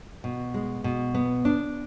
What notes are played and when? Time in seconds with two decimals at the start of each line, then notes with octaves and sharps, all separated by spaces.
0.24 B2
0.54 G#3
0.84 B2
1.15 B3
1.45 D4